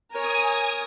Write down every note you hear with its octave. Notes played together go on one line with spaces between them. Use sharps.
A#4 C#5 G#5 D#6